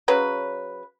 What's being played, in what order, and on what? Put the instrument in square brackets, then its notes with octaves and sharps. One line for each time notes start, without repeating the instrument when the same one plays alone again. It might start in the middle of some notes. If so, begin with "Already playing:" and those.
[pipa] C#3 F#3 B4